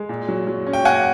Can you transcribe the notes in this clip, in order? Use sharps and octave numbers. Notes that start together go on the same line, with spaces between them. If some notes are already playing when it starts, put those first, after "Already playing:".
Already playing: G#3
A#2
F#3
F#3
C#4
G5
A#3 F#5 G#5